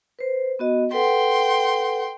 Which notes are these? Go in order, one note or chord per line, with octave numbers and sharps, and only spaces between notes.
B4 C5
B3 F#4 D#5
A4 B4 F#5 G5 C6